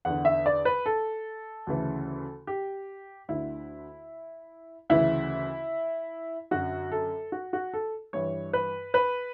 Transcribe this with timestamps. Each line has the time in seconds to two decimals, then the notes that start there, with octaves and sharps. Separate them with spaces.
0.05 E2 D3 F#5
0.25 E5
0.46 D5
0.65 B4
0.86 A4
1.67 D2 C#3 E3
2.47 G4
3.29 D2 D3 E4
4.90 D2 C#3 E3 E4
6.51 F#2 D3 F#4
6.92 A4
7.32 F#4
7.53 F#4
7.74 A4
8.13 G2 E3 C#5
8.53 B4
8.94 B4